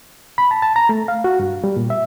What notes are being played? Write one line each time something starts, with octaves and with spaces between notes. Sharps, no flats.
B5
A5
A5
A#5
A3
F5
F#4
G2
G3
A#2
E5